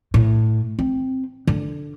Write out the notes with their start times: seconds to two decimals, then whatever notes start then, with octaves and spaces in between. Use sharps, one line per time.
0.14 A2
0.79 C4
1.47 D3